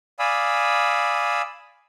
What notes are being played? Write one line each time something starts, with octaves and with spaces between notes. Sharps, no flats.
D5 F5 G#5 B5 D#6 E6